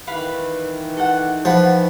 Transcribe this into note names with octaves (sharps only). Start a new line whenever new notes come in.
D#3 E3 B4 F5 B5
A4 F#5
F3 F#5 B5